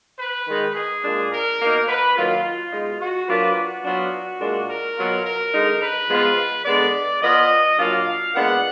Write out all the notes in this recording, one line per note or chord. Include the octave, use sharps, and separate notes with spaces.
B4
D#3 G#3 D#4
G#4
A#2 G#3 D4
A#4
B2 A#3 D#4
B4
D#3 F#3 A#3 F4
F4
B2 G#3 D#4
F#4
F#3 A#3 D4 F4 B4
F#4
F#3 B3 D4 F4
A#2 G#3 D4
A#4
B2 F#3 B3 F4
A#4
D3 G#3 D#4
B4
F3 G#3 B3 F4
D3 G#3 B3 D5
F3 B3 F4 D#5
A#2 F#3 D4 F4 F5
A#2 G#3 B3 D4 F#5